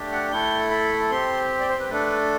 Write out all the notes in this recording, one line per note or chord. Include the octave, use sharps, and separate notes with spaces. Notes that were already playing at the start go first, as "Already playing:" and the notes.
Already playing: A3 D4 G4
F#5
A3 E4 A4 G5
B5
C4 G4 C6
D5
C5
B4
A3 D4 A4 B4